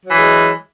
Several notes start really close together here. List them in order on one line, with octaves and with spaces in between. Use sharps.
F#3 E3 G#3